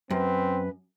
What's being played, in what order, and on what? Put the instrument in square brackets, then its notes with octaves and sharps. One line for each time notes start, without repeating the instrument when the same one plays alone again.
[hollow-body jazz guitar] F#2 [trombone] C4 [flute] B4